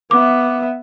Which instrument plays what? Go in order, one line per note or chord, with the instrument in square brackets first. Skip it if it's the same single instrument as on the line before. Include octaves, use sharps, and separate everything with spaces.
[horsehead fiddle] B3 E5 [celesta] D6